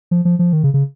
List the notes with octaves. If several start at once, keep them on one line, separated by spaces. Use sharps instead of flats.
F3
F3
F3
D#3
C#3
C#3